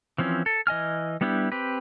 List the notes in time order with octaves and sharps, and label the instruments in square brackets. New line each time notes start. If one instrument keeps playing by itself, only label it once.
[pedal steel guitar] E3 F3 C4 C#4
A4
E3 D#5 G#5 F6
G3 B3 D4 E4 G4
C4 G4 B4